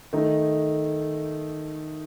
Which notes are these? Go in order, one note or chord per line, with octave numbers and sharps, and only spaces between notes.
D#3 A3 D#4